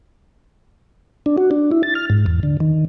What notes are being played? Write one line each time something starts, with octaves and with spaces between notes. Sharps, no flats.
D4
F#4
D4
E4
A6
F6
G#2
E2
D3
D#3